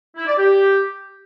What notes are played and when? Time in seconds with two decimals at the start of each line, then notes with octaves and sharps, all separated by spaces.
0.16 E4
0.27 D5
0.37 G4